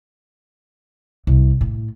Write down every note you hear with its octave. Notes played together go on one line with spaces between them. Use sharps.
C2
A2